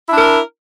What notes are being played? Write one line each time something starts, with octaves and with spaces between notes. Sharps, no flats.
D4 E4 A#4